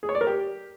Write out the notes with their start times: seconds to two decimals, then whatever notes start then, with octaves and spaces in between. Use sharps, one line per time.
0.03 G#4
0.09 C#5
0.15 D5
0.21 A#4
0.27 G4